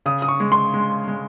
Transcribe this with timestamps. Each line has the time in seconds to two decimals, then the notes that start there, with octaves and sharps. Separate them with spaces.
0.06 C#3 D#6
0.22 D#6
0.28 C#6
0.40 G#3
0.52 C6
0.74 G#3
1.08 G#3